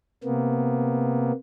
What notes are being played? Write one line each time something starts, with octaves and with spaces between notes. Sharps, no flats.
C3 A#3 B3